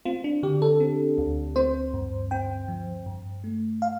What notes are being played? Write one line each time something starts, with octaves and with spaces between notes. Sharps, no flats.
C4 F4
D4
D3 G4
A4
C4
D2
C4 C5
G2
C4 G5
F3
G2
A3
F5